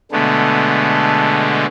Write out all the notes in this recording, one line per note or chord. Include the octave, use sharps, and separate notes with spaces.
B2 D3 G#3 A3 B3